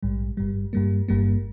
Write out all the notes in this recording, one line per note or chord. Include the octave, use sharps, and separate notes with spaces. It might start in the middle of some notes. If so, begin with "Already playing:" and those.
A#1 G#2 G3
G1 G2 G3
G2 G3 A#3
G1 G2 G3 A#3